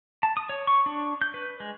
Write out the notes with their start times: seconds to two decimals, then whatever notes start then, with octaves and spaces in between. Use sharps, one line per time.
0.23 A5
0.37 D#6
0.49 C#5
0.67 C#6
0.86 D4
1.22 G6
1.34 B4
1.60 G#3